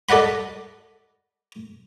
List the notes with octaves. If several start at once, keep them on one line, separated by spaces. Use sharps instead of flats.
A4 D5 D#5 F#5 B5